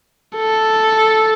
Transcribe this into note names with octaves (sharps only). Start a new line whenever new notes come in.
A4